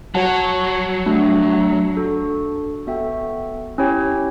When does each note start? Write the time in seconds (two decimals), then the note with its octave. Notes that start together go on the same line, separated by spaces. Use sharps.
0.15 F#3 F#4 C#5 F#5 A5
1.06 A3 D4 F#4
1.96 D4 F#4 A4
2.87 B3 F#4 A4 E5 G5
3.78 C#4 E4 G4 C#5 G5